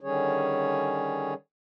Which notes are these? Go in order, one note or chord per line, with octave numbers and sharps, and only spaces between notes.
D3 D#3 G3 C#4 G#4 C#5